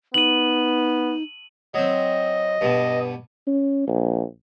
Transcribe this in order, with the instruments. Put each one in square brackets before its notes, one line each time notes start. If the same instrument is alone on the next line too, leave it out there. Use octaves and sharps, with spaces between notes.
[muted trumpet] B3 [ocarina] D#4 [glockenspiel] D#7 F#7
[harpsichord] F#3 C4 [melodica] D#5
[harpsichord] G2 B2
[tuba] C#4
A#1